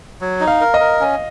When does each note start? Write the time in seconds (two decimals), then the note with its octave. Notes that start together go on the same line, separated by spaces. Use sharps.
0.21 F#3
0.40 D#4
0.47 F5
0.61 A#4
0.74 D#5
0.80 A#4
1.00 C#4